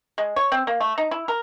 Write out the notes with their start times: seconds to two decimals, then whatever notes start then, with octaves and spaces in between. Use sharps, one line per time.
0.18 G#3
0.36 C#5
0.52 C4
0.67 A#3
0.80 A3
0.98 D#4
1.11 E4
1.28 A#4